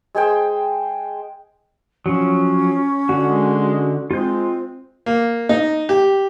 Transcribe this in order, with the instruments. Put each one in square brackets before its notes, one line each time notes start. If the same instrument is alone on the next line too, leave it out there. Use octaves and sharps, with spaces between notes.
[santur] G#3 G#4 C5 G5
[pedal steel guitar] F3 F#3 [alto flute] C#4
[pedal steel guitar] D3 F#4
[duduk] G#3
[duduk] G#3 [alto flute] C4 [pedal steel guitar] F4 G6
[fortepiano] A#3
D#4
G4